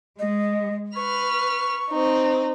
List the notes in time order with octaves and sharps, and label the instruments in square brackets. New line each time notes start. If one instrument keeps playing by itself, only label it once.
[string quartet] G#3 [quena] D#5
[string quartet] B4 F6 [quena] C#6
[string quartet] C4 D#4